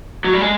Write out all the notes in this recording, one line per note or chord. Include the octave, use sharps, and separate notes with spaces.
F#3
G3
G#3